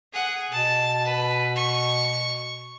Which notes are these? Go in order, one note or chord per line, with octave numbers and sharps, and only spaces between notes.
G#4 F#5
B2 A5
B4
C#6